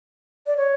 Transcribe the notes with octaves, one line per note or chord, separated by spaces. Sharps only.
D5
C#5